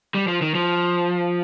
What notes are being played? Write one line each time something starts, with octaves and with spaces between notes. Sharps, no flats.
G3
F3
D#3
F3